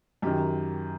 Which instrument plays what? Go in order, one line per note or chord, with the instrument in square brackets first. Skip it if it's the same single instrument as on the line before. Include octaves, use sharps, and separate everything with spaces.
[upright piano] F#2 D#3 G4